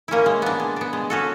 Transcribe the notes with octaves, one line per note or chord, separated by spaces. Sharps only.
A#3 C#4 E4
G#3
B3 D4
G#3
B3 D4
G#3
C#4 F#4 A4